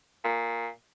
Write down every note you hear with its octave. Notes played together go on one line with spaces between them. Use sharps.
A#2